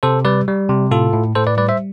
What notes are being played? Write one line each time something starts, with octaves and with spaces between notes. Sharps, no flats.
C3 A4 C5
G3 B4 D5
G3
C3
A2 F4 A4
A2
A2 A4 C5
B4 D5
G3 B4 D5
C5 E5